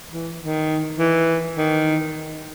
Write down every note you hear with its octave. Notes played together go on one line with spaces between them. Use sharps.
E3
D#3
E3
D#3